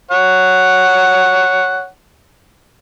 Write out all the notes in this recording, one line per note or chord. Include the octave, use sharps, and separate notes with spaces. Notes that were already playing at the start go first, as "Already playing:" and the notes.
C#5 F#5